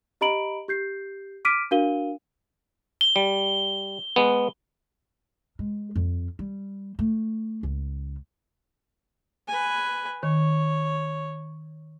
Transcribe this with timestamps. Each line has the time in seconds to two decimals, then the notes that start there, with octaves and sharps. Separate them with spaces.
0.21 G4 D#5 A#5 B5 D7 F#7
0.68 G4 G6 C7
1.45 D6 F6 B6 D7 D#7
1.71 D4 F#4 A#4 F5 D#7 G7
3.01 G7
3.16 G3
4.16 G#3 B3
5.59 G#3
5.96 F2
6.39 G3
6.99 A3
7.63 C#2
9.48 B4 G#5
10.23 D#3 C#5